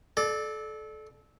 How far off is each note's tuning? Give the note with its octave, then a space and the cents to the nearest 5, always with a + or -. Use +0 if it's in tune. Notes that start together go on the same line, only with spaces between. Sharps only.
A4 -25 D5 +20